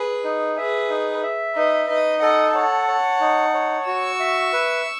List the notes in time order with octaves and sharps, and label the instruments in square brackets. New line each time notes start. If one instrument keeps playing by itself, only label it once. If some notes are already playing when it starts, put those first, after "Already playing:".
Already playing: [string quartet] G#4 B4
[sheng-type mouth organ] D#4
[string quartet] G#4 B4 [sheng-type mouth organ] E5
[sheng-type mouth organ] D#4
E5
[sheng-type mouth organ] D#4 [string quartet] B4 D#5
[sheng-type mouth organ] D#4 [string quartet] B4 D#5
[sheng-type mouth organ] A4 [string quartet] D#5 F#5
[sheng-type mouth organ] C#5 [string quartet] F#5 A5
[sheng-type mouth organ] C#5
D#4
C#5
[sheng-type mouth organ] F#4 [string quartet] C#6 E6
[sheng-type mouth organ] E5
B4